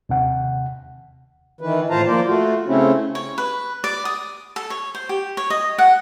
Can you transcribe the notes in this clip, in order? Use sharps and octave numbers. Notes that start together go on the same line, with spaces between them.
D#2 C3 F#5
D#3 E3 B4
A2 F4 C5 F5 A5 A#5
F3 A#3 C5 D5
A3 F4 F#4
C#3 A3 C4 C#4 E4
C#5
B4
D5
D#6
A4
C#5
C5
G4
C#5
D#5
F#5